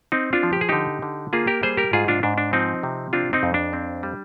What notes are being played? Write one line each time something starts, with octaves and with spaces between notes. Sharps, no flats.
C4 D#4
D4 F4
F3
G4
G#4
D3 D#4 G4
D3
A#3 F4 G#4
G4 A#4
G3 G#4 C5
G4 A#4
G#2 F4 G#4
D4 F4
G#2 D4
D4
F3 C4 D#4
C3
C4 D4 F4
C4 D#4
F2
D4
C4
G3